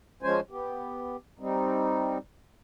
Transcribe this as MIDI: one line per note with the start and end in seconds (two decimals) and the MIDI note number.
0.22 0.40 53
0.22 0.40 56
0.22 0.40 61
0.22 0.40 72
0.22 0.40 80
0.50 1.17 59
0.50 1.17 67
1.39 2.18 55
1.39 2.18 60
1.39 2.18 63